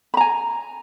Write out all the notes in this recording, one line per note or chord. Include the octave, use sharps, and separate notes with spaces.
G#5 A#5 B5